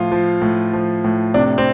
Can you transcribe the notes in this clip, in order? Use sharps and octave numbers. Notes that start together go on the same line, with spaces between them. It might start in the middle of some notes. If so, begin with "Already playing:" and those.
Already playing: A2 F3 F4
F3
A2
F3
A2
C3 D4
C4